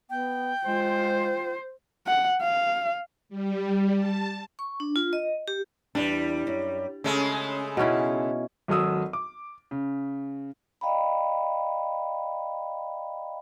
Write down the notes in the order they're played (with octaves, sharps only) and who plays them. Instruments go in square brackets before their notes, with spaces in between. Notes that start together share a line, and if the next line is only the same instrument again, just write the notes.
[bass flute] B3 [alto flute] G5
[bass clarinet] G#3 [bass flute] F4 [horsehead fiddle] C5
[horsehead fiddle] F#5
F5
[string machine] G3
A5
[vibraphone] C#6
D4
F4
D#5
G4
[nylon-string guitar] E2 D4 [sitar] G3
[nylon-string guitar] F#2
[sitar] C#3 G#3 A3 [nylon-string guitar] C#4
[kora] B2 C#4 E4 [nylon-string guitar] D#4 G#4
[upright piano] G#1 F#3 A4 D#6 E6
D6
C#3
[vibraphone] D5 D#5 F5 G5 A#5 B5